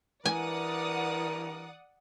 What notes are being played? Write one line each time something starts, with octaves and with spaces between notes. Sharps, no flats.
G2 B2 E3 A#4 D5 F#5 G#5 D#6